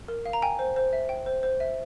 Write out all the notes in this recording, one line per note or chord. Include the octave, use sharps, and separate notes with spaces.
A#4
F5
A#5
G5 G#5
C5
C5
E5
G5
C5
C5
E5